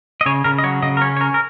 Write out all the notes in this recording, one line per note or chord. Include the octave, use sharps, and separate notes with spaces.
D#5
C#3 C#5
C#3 A#4
D#5
F#3 C#5
C#3 D#5
A#4
C#4 C#5
C#5
C#4 A#4
A#4